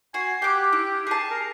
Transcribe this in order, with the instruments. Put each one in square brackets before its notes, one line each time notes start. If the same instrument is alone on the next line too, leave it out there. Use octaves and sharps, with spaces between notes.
[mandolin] F#4 [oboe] G#5 [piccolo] C7
[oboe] G4 [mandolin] G5 D6 [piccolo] F#6
[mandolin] E4
[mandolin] G#4 A5 [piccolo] C7
[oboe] A#4